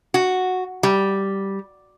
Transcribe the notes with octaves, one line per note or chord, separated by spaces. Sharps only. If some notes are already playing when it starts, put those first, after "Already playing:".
F#4
G3